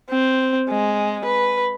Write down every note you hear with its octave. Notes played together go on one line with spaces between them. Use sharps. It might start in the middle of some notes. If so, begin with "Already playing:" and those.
C4
G#3
B4